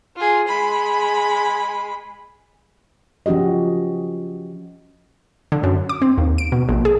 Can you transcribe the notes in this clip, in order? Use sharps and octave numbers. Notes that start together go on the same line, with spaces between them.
F4 G#4
G#3 B5
F3 C#4 F#4 G4 D#5
D3
F#2
D6
C4
D#2
D7
B2
A#1
G#4